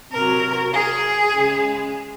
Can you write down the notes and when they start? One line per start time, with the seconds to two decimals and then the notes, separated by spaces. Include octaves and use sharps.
0.12 C3 F#3 A#4
0.73 G#4
1.35 C#3 G#3